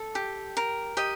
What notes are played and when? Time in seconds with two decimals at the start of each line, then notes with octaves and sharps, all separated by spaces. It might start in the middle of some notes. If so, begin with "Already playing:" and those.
Already playing: A4
0.15 G4
0.57 A#4
0.97 G4 D#5